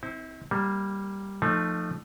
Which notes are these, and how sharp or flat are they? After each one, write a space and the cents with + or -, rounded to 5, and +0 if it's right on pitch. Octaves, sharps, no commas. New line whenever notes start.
C4 +0 E4 -40
G3 +0 A#3 +0
F3 +0 A3 +10 D#4 -30